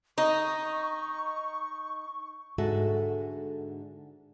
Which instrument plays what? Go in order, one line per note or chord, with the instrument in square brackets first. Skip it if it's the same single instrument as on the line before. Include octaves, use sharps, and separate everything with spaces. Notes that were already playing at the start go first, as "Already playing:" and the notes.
[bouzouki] D#4 [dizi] C#6
[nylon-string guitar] G#2 D3 F#4 A4 E5